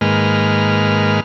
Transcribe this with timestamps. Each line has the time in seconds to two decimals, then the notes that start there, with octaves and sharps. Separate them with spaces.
0.01 G#2 D#3 G#3 A#3 B4 F6